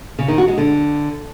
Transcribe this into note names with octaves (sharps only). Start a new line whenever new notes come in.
C#3
D#3
F#4
G#3
D3